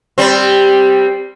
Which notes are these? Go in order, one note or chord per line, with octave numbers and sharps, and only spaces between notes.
G3 C4